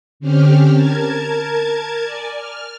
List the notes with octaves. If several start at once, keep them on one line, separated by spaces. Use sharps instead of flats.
D3 C4 C#4 G4 F6
A#4 A5 G#6
D5 G#5
F6